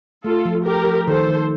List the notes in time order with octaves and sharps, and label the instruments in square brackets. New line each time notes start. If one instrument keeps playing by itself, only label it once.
[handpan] A3 [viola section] F4 A4
[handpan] F3
[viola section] G4 A#4 [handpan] A4
[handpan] F3
[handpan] D#3 [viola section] A4 C5
[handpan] D#3